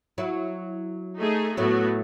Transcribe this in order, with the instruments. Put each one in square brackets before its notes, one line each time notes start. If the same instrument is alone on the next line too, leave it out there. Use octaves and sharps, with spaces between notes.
[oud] F#3 E4
[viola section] A3 D#4 G#4
[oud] A2 F#3 [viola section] A3 B3 F#4